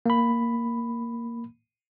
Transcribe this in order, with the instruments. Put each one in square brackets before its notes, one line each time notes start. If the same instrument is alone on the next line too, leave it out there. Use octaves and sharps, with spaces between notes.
[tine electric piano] A#3 B5